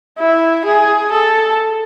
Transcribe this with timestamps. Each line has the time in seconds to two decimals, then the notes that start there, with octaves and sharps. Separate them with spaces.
0.18 E4
0.65 G#4
1.11 A4